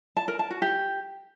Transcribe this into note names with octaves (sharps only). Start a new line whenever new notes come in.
A5
A#4
A5
F#4
G4